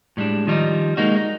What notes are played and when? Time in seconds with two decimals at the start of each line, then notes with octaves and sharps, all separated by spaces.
0.17 A2 G3 G#3 D4
0.47 D#3 F3 G3 C#4 D#4
0.97 G#3 A#3 D#4 F#4
1.17 D#4